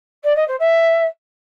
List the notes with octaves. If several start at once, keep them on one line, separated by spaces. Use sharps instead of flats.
D5
D#5
C5
E5